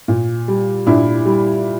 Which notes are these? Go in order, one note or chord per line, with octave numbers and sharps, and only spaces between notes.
A#2
G3
A#2 D4 E4
G3